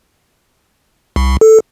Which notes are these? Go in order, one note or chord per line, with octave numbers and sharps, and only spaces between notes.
C2
A4